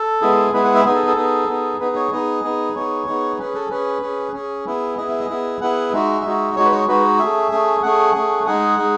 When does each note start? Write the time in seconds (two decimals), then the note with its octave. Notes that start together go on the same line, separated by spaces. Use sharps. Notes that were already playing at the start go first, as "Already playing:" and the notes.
Already playing: A4
0.21 G#3 B3 E4 G#4
0.53 G#3 B3 E4 G#4 B4
0.64 F#5
0.75 E5
0.85 B3 D#4 G#4
0.96 A4
1.07 A4
1.17 B3 D#4 G#4
1.48 B3 D#4 G#4
1.80 B3 D#4 G#4 B4
1.96 C#5
2.12 B3 D#4 G#4 D#5
2.44 B3 D#4 G#4
2.75 B3 D#4 G#4 C#5
3.07 B3 D#4 G#4
3.39 C#4 G#4 B4
3.55 A4
3.70 C#4 G#4 B4
4.02 C#4 G#4
4.34 C#4 G#4
4.66 B3 E4 G#4
4.97 B3 E4 G#4 D#5
5.09 E5
5.20 D#5
5.29 B3 E4 G#4
5.61 B3 E4 G#4 F#5
5.92 G#3 D#4 F#4 E5
6.25 G#3 D#4 F#4
6.56 G#3 D#4 F#4 C#5
6.65 B4
6.72 C#5
6.88 G#3 D#4 F#4 B4
7.19 A3 C#4 G#4 E5
7.51 A3 C#4 G#4
7.83 A3 C#4 G#4 F#5
8.15 A3 C#4 G#4
8.46 G#3 D#4 G#4 F#5
8.78 G#3 D#4 G#4